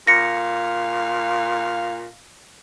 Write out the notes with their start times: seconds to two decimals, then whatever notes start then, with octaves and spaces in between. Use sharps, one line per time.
0.07 A#2 F5 A#6 C#7